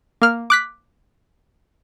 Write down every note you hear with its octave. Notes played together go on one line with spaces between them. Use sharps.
A#3 F6
D6 F#6 B6